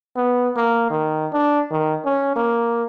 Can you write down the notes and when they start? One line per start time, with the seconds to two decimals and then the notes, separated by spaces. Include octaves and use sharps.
0.16 B3
0.56 A#3
0.90 D#3
1.33 D4
1.71 D#3
2.05 C#4
2.36 A#3